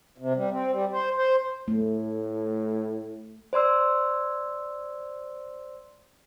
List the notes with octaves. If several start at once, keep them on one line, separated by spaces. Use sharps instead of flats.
C3
G3
C4
G3
C5
C5
A2 A3
C5 D5 C6 E6